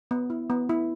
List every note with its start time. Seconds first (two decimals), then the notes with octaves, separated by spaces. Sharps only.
0.11 B3
0.30 E4
0.50 B3
0.69 E4